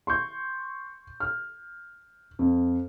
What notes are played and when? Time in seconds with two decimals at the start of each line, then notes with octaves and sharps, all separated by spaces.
0.07 C6 C#6 G6
1.20 F6
2.39 F2